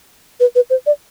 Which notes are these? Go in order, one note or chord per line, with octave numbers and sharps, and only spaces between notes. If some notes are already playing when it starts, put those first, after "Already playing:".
B4
B4
C5
D5